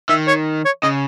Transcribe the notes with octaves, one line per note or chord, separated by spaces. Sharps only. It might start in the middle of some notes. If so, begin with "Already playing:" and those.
D#3 E5
C#5
C#5
C#3 D#5